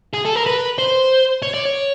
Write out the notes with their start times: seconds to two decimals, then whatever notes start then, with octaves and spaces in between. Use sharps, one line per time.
0.14 G#4
0.25 A4
0.36 A#4
0.46 B4
0.78 C5
1.42 C#5
1.54 D5
1.65 C#5